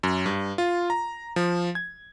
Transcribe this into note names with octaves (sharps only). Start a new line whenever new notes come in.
F#2
G2
F4
A#5
F3
G#6